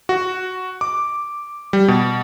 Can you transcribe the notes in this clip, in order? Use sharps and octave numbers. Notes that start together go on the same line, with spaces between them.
F#4
D6
G3
B2